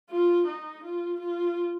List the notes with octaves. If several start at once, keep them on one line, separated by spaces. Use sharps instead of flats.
F4
D#4
F4
F4